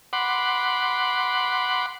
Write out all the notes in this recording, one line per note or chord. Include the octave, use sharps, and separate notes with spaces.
F#5 B5 C6 D6